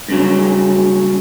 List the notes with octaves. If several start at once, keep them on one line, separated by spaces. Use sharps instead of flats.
G2 C#3 F#3